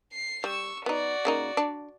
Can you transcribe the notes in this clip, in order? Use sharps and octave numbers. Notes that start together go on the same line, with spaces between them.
C7
G3 C#6 E6
B3 D#4 F#4 D5
C#3 A#3 D#4
D4